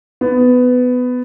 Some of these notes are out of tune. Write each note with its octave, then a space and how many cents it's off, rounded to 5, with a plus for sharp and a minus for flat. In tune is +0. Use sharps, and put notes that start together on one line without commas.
B3 +15